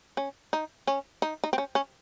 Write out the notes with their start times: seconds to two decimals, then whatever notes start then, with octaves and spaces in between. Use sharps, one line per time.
0.17 C#4
0.53 D#4
0.87 C#4
1.22 D#4
1.44 D#4
1.53 C4
1.58 C#4
1.75 C#4